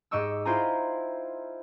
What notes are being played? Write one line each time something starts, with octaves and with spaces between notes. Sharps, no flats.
G#2 G4 D#5 C#6 E6
E4 F4 C5 G5 G#5 A#5